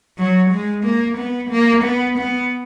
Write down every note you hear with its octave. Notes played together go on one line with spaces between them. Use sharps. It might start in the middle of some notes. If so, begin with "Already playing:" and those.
F#3
G#3
A#3
B3
A#3
B3
B3